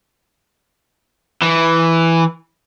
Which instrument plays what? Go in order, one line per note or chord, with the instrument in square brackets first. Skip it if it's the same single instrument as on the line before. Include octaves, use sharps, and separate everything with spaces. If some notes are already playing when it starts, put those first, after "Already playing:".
[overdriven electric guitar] E3